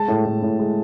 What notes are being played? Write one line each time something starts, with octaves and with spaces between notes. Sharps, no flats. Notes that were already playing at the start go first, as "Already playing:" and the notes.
Already playing: G#3 A5
A2
A2
A2
G#3